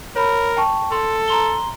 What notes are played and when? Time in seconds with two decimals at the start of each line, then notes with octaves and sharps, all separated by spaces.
0.16 A#4 C#5 B5
0.57 G5 A5 C#6
0.92 A4 C6
1.28 A#5 C6 G7